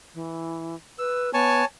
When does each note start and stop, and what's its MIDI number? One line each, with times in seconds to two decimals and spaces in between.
0.14 0.75 52
0.99 1.33 71
0.99 1.30 88
1.34 1.63 59
1.34 1.65 73
1.34 1.65 80
1.34 1.65 81